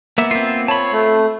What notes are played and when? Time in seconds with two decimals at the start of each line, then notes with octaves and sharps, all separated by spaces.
0.18 A#3 B3 E5
0.31 C4 F4
0.68 C#5 A5 B5
0.93 A3